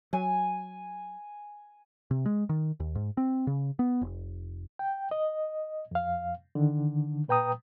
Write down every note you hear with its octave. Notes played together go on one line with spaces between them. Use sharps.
F#3 G#5
C3
G#3
D#3
D#2
G#2
C4
C#3
B3
F1
G5
D#5
F2 F5
D3 D#3
A#2 B4 G5 A#5 D#6